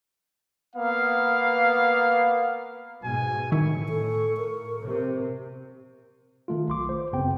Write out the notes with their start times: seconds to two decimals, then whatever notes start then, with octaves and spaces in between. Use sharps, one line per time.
0.75 A#3 B3 F5
3.04 G#2 B2 G#5
3.52 A2 D#3 E4 C#6
3.89 A4
4.37 A#4
4.83 C3
6.48 D#3 A3 F4
6.68 B1 C6 D6
6.89 C5
7.12 G1 F#2 C#3 B3 C4 G5